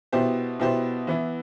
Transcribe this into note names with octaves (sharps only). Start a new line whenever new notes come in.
B2 B3 E4 G4 C5
B2 B3 E4 G4 C5
E3 B3 E4